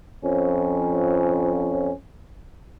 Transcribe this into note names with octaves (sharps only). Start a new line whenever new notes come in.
F2 F3 C#4